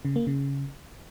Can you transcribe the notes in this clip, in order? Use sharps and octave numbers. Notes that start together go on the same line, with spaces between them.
C#3
A#3
C#3